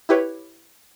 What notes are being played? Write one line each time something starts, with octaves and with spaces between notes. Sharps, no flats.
E4 G4 B4 C#5